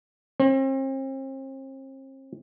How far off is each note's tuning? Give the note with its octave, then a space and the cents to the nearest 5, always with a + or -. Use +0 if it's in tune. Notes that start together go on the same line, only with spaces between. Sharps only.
C4 +40